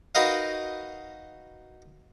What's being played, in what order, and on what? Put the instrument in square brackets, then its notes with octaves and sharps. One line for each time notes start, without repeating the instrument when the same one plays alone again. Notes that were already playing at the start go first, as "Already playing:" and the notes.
[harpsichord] D#4 F#4 A#4 B4 D#5 F5